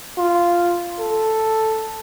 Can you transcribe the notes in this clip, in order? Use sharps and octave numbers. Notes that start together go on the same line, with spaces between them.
F4
A4